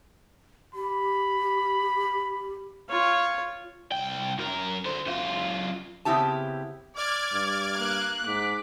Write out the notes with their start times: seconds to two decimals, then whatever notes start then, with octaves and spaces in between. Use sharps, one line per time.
0.75 G4 B5
2.89 F4 C#5
3.92 C2 G5
4.38 F#2 A#4
4.85 D3 C5
5.06 F#2 F4
6.05 C#3 B3 C4 E4 G4 A5
6.96 D5 D6 F6 G#6
7.33 G2
7.77 A#3 F#6
8.26 G#2 D6 B6